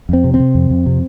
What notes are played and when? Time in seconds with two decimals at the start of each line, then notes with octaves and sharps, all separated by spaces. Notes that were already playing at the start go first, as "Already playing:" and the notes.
0.09 F2 C4
0.24 C3
0.34 C4
0.39 C3
0.55 F2
0.70 F2
0.86 C3